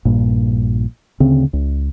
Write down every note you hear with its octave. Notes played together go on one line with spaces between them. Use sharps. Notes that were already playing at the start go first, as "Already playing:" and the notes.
A#1 G2 A#2
D2 C#3 C4 C#4
C#2